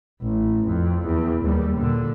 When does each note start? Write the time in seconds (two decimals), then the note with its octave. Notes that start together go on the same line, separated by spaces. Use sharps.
0.22 A1
0.68 F2
1.05 E2
1.44 D#2 G3
1.78 A#2 D3